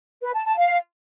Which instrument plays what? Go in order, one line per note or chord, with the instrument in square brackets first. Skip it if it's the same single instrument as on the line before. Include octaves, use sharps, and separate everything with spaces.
[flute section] B4
A5
A5
F5